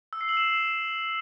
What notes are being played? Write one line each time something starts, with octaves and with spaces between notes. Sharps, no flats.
E6
C7
F#7
E7